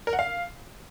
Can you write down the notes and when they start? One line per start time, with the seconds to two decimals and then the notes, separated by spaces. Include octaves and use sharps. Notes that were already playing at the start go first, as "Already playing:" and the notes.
0.07 A#4
0.13 F#5
0.19 F5